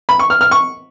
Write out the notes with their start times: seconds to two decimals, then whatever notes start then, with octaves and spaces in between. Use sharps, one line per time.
0.09 B5
0.19 C#6
0.30 F6
0.41 F6
0.51 C#6